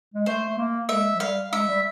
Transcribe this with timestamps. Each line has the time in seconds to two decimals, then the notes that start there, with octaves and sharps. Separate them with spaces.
0.14 G#3
0.26 A3 C5
0.49 A3
0.58 A#3
0.89 G#3 E5
1.14 F#3
1.20 G3 F5
1.53 G#3 E5
1.68 G3